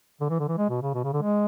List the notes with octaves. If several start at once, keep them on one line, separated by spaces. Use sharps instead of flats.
D3
E3
D3
E3
G#3
B2
C#3
B2
C#3
D3
G#3